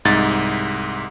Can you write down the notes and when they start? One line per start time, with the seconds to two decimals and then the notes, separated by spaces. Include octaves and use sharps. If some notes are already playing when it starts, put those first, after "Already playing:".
0.05 C2 G#2 A6